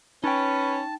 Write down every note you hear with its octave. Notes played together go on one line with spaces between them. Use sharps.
C#4 D#4 B4 G5 A5